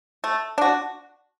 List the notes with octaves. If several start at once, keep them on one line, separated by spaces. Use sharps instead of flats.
A3
D4 F#4